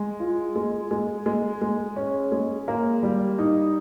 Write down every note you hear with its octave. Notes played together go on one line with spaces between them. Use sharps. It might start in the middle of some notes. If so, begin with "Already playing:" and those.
Already playing: G#3
F4
G#3
G#3
G#3
G#3
C#4
G#3
A#3
G3
D#4